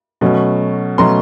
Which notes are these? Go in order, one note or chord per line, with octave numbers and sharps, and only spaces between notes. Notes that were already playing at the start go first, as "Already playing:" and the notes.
B2 F#3 A3 C#4
B2 F#3 A3 C#4 A#5 C6